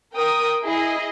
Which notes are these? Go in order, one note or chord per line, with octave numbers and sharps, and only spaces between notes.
A#4 G5 D#6
E4 G#4 D#5